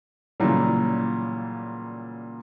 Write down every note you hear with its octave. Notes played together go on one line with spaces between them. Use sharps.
A#2 C#3 E3 F#3 G3